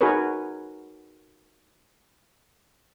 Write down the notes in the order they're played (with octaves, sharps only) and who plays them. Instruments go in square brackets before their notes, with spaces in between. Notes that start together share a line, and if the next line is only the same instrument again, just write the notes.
[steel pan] D#4 F#4 G#4 A#4 B4 C#5